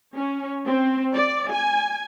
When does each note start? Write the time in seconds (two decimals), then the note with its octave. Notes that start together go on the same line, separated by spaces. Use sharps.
0.15 C#4
0.67 C4
1.14 D5
1.51 G#5